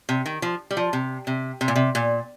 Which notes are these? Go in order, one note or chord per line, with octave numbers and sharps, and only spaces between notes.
C3
D#3
F3
G3
F3
C3
C3
C3
A#2
C3
A#2